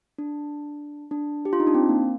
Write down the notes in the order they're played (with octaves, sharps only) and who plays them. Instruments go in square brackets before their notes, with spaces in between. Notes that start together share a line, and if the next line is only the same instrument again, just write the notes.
[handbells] D4
D4
G4
F4
D#4
D4
C4
A#3